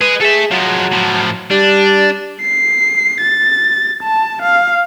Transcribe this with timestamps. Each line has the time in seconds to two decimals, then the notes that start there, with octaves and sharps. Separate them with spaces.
0.01 G#4 B4 D#5
0.21 G#4 A4 E5
0.51 F3 F#3 G#3
0.92 A2 F3
1.51 G3 D4
2.42 C7
3.21 A6
4.03 A5
4.43 F5